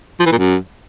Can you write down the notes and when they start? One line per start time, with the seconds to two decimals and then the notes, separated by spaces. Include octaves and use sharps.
0.20 F3
0.26 E3
0.32 A#2
0.38 F#2